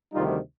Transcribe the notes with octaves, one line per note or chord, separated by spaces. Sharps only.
D2 C3 D#3 G3 D#4 F4